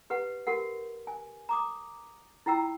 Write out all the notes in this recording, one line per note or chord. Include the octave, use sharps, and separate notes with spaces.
G4 B4 F#5
F#4 G4 A#4 F#5
G#5
A#5 D6 D#6
E4 F4 G5 A#5 E6